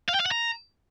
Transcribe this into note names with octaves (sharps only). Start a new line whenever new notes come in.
F5
G5
F5
F#5
A#5